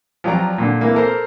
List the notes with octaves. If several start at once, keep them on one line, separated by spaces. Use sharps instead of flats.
F3 F#3 G4 D5 A#5
A#2 D3
E3 A#3
A4 A#4 C5